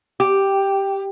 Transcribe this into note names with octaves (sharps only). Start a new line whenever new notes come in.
G4